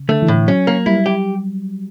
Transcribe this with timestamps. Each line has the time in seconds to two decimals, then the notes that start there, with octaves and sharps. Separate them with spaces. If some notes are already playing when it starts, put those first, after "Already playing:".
Already playing: C#3
0.09 D3 A3
0.22 E3
0.28 A2
0.34 E3
0.48 F#3 C#4
0.67 A#3
0.86 G3 E4
1.06 G4